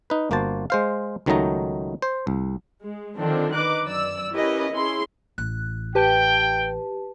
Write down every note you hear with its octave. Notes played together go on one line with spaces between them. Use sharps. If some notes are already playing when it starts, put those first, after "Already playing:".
D#4 B4
G1 A#3 F#4 C5 A5
G#3 C5 F5
C#2 D#3 F#3 A3 D#4 A#5
C5
C2
G#3
D3 D#3 F3 C4 D4 A4
D#4 B4 D6 F#6
F#2 D5 E6
C#4 E4 G4 A#4 B4 D#5
C#4 E4 G#4 C6
A1 F#6
G4 B4 G5 A5